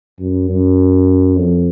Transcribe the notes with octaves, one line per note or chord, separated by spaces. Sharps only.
F#2
F#2
F2